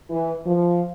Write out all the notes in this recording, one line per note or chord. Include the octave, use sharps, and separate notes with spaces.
E3
F3